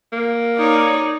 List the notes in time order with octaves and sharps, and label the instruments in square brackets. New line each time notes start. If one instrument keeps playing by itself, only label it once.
[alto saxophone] A#3
[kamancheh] D#4 [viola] C#5 D5